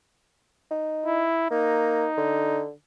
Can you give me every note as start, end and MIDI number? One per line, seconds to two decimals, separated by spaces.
0.71 1.24 63
1.06 1.48 64
1.51 2.07 58
1.51 2.63 63
2.17 2.71 50